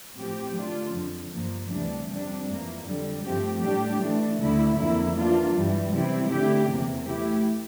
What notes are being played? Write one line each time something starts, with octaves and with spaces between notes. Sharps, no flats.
A2 F3 C4 G4
D3 A3 D4 F4
F2 D3 F3
G2 F3 A#3
D2 C3 E3 G3 D4
F2 C3 G3 D4
F2 E3 A#3
F2 D3 G3
G2 F3 A3 C4 G4
A2 G3 D4 G4
E3 A3 D4
D2 D3 A3 E4
F2 D3 F3 A#3 E4
E3 A#3 D4 F4
G2 E3 G3
C3 E3 G3 C4 E4
D3 A3 E4 G4
E2 C3 E3 A#3
E3 A3 E4 G4